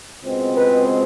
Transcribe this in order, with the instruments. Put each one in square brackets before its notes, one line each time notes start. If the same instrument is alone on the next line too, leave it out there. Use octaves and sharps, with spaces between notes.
[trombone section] C#2 B2 G#3 C4
B4